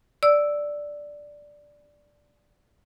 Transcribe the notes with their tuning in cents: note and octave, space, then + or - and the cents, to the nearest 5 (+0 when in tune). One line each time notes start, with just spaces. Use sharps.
D5 +0 E6 +0